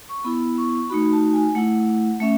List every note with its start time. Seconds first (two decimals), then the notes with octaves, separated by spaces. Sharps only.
0.09 C#6
0.24 B3 E4 B5
0.58 C#6
0.90 A3 D#4 F#4 B5
1.13 A5
1.33 G#5
1.55 A3 E4 F#5
2.20 A3 C#4 E5